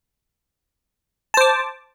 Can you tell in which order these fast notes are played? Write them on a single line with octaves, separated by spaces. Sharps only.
A5 C5 D6